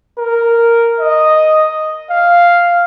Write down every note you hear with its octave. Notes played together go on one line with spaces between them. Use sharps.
A#4
D#5
F5